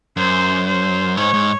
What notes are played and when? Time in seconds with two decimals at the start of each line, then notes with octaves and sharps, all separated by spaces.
0.17 F#2 C5
0.67 C5
1.17 G#2 C#5
1.34 G#2